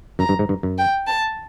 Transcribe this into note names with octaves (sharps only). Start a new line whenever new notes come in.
F#2 A#5
G2
G#2
G2
F#2
G5
A5